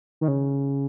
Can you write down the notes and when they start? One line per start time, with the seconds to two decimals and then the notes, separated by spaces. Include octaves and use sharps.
0.21 D#3
0.28 C#3